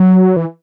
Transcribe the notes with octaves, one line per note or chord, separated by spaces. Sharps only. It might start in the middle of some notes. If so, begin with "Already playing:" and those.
Already playing: F#3
E3